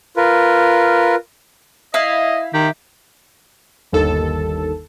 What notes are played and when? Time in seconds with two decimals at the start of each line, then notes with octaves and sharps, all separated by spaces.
0.17 F4 A#4 B4
1.94 E4 D#5 F5
2.54 D#3 G4
3.92 G1 D#2 A4